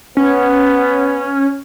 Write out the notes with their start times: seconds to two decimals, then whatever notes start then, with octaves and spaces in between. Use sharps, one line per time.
0.17 B3 C#4